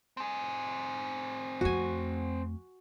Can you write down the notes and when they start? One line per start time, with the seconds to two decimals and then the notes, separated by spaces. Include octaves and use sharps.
0.17 C4 G#4
1.61 F2 A3 F#4 G#5